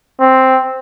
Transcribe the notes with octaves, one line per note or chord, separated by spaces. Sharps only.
C4